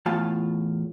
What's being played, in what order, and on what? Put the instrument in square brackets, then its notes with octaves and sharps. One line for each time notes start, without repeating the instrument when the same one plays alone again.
[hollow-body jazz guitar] E2 A2 F4 A5